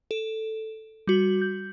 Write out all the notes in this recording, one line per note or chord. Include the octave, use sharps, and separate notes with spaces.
A4
G3 F#4
G6